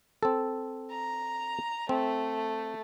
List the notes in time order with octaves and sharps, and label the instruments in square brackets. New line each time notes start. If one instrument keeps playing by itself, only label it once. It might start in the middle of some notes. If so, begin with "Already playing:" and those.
[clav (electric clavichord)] C4 A4
[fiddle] A#5
[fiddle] A3 [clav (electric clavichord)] C4